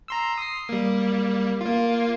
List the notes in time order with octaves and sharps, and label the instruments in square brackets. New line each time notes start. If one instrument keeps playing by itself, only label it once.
[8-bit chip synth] A#5 C6 E6
D#6 C7
G3 A#3
A#3 F4